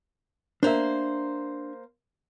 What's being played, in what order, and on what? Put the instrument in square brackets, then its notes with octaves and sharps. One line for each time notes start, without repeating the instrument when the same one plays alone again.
[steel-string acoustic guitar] A#3 C5 [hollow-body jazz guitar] D4 E5